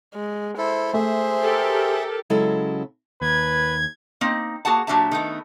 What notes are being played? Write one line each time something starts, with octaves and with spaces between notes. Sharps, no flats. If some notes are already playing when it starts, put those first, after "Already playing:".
G#3
E4 A4 C5
A3 G#4 C5 E5
G4 A4 A#4
C#3 F#3 G#3 C#4 E4 A4
D#2 B4 G#6
A#3 C4 D#4
A#3 F#4 G#4 F#5 A5
A#2 F#3 D4 G4 E5 A5
D#3 A3 B3